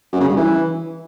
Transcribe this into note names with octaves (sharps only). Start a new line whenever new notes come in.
F#2
C#3
G2
E3